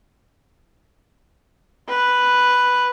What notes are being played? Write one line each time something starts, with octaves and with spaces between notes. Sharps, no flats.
B4